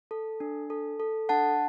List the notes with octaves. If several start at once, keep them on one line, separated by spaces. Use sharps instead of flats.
A4
D4
A4
A4
D4 F#5 A5